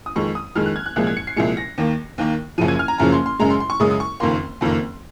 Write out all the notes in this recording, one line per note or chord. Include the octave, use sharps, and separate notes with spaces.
D#6
F2 D#3 G#3 C#6
D#6
F2 D#3 G#3 F6
F#6
G#6
F#6
C2 A#2 F3 G#3 F#6
G#6
C#7
C7
C2 A#2 F3 G#3 C#7
A#6
D#2 D#3 A#3
D#2 D#3 A#3
F#1 F#2 C#3 F3 D#7
G#6
F6
A#5
F#1 F#2 C#3 F3 A#5
C6
C6
F#2 C#3 G#3 A#5
C6
C6
C#6
F#2 C#3 G#3 D#6
D#6
C#6
F#1 F2 D#3 A#3 C6
F#1 F2 D#3 A#3